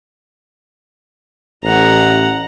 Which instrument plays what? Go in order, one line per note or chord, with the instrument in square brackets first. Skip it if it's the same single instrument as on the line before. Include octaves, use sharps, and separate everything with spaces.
[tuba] A1 [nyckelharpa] F#5 A#5